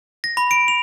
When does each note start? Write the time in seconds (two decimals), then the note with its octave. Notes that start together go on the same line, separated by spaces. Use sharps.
0.24 A#6
0.37 B5
0.51 D7
0.68 F7